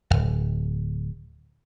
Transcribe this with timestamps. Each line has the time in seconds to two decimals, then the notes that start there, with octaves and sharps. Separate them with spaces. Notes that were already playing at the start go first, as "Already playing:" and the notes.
0.10 D1 G#1